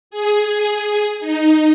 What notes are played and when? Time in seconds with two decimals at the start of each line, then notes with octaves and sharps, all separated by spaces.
0.11 G#4
1.20 D#4